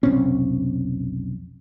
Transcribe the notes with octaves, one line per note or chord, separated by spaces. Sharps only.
F1 B1 C4 C#4